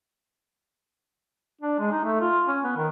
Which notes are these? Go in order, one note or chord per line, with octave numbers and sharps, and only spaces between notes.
D4
G#3
D#4
A3
F4
C#4
B3
D#3